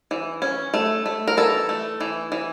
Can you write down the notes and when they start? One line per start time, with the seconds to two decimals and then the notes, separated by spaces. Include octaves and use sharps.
0.11 E3
0.42 C#4
0.74 A3
1.06 A3
1.28 A#4
1.37 E3 A4
1.69 A3
2.01 E3
2.32 E3